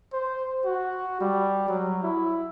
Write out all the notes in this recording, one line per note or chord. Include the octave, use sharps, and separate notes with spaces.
C5
F#4
G3
F#3
E4